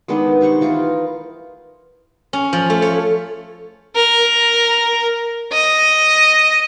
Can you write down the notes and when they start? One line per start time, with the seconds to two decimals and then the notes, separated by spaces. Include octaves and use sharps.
0.08 D#3 G#3 B3 D4
0.41 G3 C5 F#5 C#6
0.61 E3 F4 G#4 A#4
2.33 C#4
2.53 F3
2.70 A3
2.82 C#5
3.95 A#4
5.52 D#5